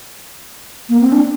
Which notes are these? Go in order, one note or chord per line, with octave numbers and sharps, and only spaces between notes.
A#3
C4
D4